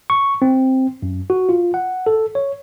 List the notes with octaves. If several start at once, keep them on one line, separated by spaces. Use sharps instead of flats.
C#6
C4
F#2
F#4
F4
F#5
A4
C#5